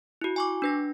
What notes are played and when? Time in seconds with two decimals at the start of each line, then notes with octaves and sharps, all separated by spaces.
0.21 E4 F#4
0.36 G#5 C#6 D6
0.62 D4 B4 A#6